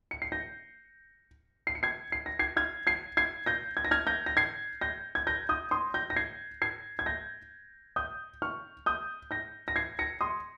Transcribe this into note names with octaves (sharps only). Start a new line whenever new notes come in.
C#7
C7
G6 A#6
C7
C#7
G#6 C7
C7
A#6
G#6 C7
F6 G#6
G#6 C7
G#6 C7
G6 A#6
G#6
A#6
F6 G#6
G6 A#6
A#6
G#6 C7
G6 A#6
G#6
G6 A#6
D#6 G6
C6 D#6
G6 A#6
A#6
G#6 C7
G#6 C7
G#6
G6 A#6
D#6 G6
C#6 F6
D#6 G6
G6 A#6
A#6
G#6 C7
A#6 C#7
C6 D#6